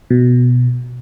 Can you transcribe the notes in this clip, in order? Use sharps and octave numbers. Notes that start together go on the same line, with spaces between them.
B2